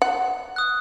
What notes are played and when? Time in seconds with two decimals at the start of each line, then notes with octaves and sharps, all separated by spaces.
0.02 F#5
0.56 D#6 F#6